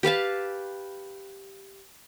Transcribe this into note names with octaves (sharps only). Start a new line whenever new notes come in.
G4 B4 F5 A5